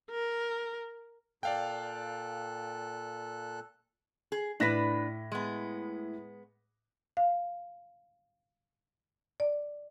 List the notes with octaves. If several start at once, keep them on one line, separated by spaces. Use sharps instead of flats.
A#4
A#2 A4 D5 F5 G5 F#6
G#4
A2 D4 B4 A#6 B6
G#3 B3
F5
D5